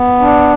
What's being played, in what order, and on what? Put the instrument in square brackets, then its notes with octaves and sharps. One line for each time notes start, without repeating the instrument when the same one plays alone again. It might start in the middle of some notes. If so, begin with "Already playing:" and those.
Already playing: [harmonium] B3
D4